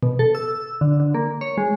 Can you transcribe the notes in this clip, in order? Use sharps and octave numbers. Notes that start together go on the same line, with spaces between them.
B2
A4
E6
D3
D3
A#3
C#5
G#3